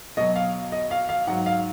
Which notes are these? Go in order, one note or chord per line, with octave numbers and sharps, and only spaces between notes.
B2 F#3 D#5
F5
D#5
F5
F5
G#2 F#3 F#5
F5